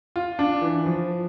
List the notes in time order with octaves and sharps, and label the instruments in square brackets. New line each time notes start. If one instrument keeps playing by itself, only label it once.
[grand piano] F4
D4
E3
F3